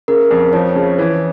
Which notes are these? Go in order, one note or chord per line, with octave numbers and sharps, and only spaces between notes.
C#3 A#4
F2
F3 C#5
C#3
E3